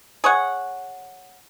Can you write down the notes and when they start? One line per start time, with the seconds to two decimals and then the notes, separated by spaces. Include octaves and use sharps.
0.24 G#4 C#5 F#5